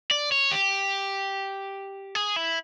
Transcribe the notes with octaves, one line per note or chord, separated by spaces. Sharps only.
D5
C#5
G4
G#4
E4